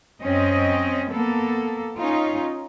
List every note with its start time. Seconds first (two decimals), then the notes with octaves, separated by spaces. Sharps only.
0.22 F#2 C4 C#4 D#5
1.10 A#3 B3 A4
1.98 C#4 D#4 F4